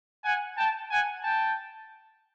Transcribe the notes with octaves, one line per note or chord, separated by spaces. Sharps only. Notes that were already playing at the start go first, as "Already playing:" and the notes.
F#5 G#5
G5 A5
F#5 G#5
G5 A5